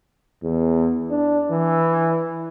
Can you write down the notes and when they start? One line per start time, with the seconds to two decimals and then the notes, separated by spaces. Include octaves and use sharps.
0.43 E2
1.10 D4
1.51 E3